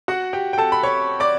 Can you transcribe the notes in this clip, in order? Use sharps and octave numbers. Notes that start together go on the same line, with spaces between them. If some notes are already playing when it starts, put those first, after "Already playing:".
F#4 F#5
G4 G5
G5
A4 A5
B5
C#5 C#6
D5 D6